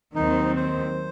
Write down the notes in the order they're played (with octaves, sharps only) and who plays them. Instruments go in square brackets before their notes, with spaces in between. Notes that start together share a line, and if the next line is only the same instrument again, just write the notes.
[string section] D#2 D#3 F#3 C4 [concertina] D#4
[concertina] C5